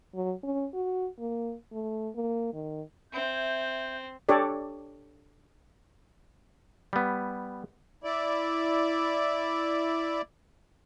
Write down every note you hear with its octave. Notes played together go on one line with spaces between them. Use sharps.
F#3
C#4
F#4
A#3
A3
A#3
D#3
C4 E5 G6
D4 G4 A4 C#5 D5
G3 B3
E4 D5